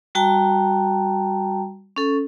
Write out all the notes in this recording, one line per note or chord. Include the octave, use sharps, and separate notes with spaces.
G3 F#4 G5 A5 A#5
C#4 A4